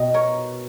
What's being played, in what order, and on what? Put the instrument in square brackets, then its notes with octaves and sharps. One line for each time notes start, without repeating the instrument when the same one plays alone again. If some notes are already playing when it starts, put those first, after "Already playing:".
Already playing: [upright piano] B2 [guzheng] D#4 G4 D#5
[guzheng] A#4 C#5